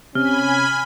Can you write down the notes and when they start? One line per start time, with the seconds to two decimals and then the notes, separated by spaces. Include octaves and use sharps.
0.15 C3 C#4 G#5 B5 F6